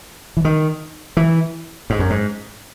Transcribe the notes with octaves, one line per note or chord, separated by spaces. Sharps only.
E3
D#3
E3
G#2
F#2
G#2